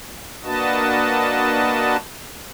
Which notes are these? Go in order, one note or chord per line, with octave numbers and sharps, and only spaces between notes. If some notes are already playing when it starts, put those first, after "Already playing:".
A#3 D4 F#4 B4 D#5 A5